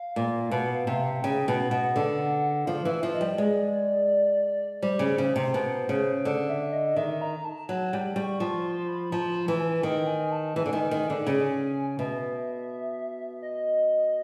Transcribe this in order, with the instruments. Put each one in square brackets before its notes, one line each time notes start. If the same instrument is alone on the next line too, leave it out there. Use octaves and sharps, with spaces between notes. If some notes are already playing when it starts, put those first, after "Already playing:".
Already playing: [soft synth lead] F5
[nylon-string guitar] A#2
B2
C3
[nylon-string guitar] C#3 [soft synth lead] G5
[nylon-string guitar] B2
[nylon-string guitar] B2 [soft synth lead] F#5
[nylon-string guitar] D3
[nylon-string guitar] F3 [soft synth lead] F5
[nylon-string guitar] E3
[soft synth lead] E5
[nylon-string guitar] F3
[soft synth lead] D#5
[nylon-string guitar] G3
[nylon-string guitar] G#3 [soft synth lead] D5
[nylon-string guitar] G3 [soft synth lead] C5
[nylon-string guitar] C#3
C#3
C3
B2
C#3
D3
[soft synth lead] E5
D#5
[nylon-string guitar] D#3 [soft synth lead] E5
[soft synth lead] A#5
A5
[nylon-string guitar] F#3 [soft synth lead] A5
[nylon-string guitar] G3
[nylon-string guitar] G3 [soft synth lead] C#6
[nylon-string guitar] F3 [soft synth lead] C#6
[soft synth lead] C6
B5
[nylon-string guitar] F3 [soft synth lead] A#5
[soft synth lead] A5
[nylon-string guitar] E3
[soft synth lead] G#5
[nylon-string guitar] D#3 [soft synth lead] G5
[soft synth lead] G#5
A5
[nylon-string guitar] E3 [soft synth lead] G#5
[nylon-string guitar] D3
D#3
D#3
D3
C#3
[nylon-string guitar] B2 [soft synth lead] E5
[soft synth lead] D#5